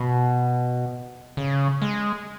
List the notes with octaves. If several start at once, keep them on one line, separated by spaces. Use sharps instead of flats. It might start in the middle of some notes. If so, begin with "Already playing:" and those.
Already playing: B2
C#3
G#3